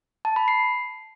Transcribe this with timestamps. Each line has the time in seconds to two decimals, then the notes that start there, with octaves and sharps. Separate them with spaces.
0.25 A5
0.36 B5
0.48 C7